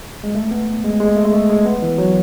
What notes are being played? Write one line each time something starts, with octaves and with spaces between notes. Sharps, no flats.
G#3
A3
B3
G#3
G#3
A3
G#3
A3
G#3
B3
E3
F#3